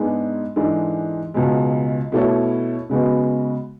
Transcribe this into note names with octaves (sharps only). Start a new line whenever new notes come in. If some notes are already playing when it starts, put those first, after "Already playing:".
Already playing: G#2 G#3 B3 D4 G#4
G#2 E3 G#3 D4 A4
C#2 B2 G#3
B2 A3 E4 A4 C#5
C#3 G#3 B3 F#4